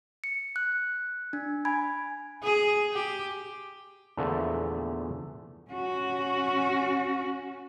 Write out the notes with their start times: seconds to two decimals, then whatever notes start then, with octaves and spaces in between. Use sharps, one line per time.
0.24 C#7
0.56 F#6
1.33 D4
1.65 G#5 B5 G#6
2.44 G#4
2.93 G4
4.17 E2 A#2 D3 E3 F3 A3
5.71 C#4 F#4